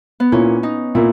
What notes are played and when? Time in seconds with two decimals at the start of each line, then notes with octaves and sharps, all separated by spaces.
0.20 B3
0.32 A#2 A#3 C#4 E4
0.63 D#4
0.95 A#2 A#3 E4